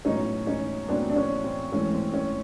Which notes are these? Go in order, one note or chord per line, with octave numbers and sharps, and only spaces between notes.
A2 F#3 B3 C#4 D#4
C#4 D#4
A2 F#3 B3 C4 D4
D4
C#4
C4
G#2 E3 A3 C4 C#4
C4
C#4